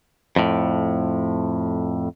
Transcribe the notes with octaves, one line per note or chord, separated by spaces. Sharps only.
F2 A2